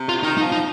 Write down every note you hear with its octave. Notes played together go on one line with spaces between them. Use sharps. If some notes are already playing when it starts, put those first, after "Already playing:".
Already playing: C3
F4
D#3 D#4
D#4
F3
D#4